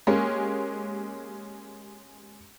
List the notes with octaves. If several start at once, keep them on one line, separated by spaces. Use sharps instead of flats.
G#3 A#3 C#4 G4